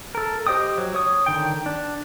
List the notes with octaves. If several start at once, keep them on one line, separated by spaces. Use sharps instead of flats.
A4 A#4
G4 C5 D#5 G5 D#6
F#3
C#5 D#6
D3 D#3 G5
D4